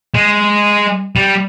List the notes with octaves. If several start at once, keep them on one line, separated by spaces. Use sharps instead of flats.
G#3
G3